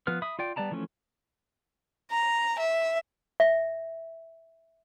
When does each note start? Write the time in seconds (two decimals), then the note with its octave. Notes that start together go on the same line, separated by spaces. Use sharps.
0.07 F3 B3 B4 F6
0.22 E5 B5 D#6
0.39 F4 D5 G5
0.56 G3 B3 D5 A5 A#5
0.71 E3 F3 A3 C#4
2.11 A#5
2.59 E5
3.40 E5